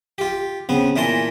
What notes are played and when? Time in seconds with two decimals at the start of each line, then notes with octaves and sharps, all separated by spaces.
0.18 F4 G4
0.69 C#3 B3 C4
0.96 A#2 E3 A#4 A5 C6